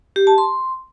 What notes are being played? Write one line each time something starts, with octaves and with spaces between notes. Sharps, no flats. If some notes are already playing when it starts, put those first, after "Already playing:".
G4
A5
C6